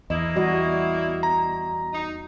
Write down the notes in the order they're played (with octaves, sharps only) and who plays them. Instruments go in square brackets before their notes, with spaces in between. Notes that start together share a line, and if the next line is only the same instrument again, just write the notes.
[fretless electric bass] E2 [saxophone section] A#3 E4 [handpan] D#5
[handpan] G3 F#4 D#5
[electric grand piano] A#5
[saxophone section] D#4